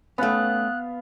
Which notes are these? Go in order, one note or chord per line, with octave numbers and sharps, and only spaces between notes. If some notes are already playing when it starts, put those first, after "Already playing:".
A3 B3 C#4 F5 F#6